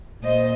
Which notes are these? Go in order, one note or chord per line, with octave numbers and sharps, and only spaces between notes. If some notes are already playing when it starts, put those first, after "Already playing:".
A#2 C5 D#5